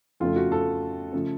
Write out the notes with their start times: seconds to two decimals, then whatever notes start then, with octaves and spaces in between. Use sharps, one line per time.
0.20 F2 C#3 F3 A3 F4
0.36 F#4
0.52 A4
1.13 C#3 F3 A3